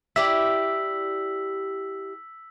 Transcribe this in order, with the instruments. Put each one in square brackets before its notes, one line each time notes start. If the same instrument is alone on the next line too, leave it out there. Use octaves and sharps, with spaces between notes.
[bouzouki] E4 G4 D5 [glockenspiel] E6 B6 F#7